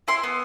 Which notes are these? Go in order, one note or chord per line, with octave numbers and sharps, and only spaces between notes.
E4 C6
B3